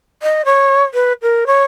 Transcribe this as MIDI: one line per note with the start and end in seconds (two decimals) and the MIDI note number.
0.23 0.42 75
0.45 0.84 73
0.94 1.13 71
1.22 1.44 70
1.47 1.63 73